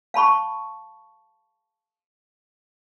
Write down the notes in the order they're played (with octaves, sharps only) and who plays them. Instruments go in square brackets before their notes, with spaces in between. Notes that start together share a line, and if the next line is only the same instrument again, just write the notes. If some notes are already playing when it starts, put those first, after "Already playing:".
[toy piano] F5 A5 B5 C#6